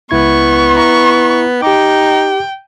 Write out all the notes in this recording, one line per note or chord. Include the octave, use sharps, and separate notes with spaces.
C#2 B3 E4 C#6 G#6
E4 A#5 C#6
D#4 G4 G5 D6